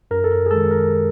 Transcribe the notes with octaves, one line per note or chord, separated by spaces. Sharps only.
F#2 A#4
A4
A#4
G#4
D#3 G#3 A4
A#4